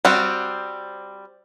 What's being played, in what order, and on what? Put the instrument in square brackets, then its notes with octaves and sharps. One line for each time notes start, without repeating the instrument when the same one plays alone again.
[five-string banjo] G3 C4 F#4